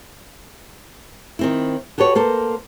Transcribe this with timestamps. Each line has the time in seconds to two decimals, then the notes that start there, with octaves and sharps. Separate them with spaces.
1.39 D#3 C4 E4
1.98 F#4 G4 A4 B4 C#5
2.15 A#3 A4 C5